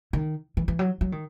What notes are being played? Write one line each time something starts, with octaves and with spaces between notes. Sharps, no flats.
D#3
E3
E3
F#3
F#3
D#3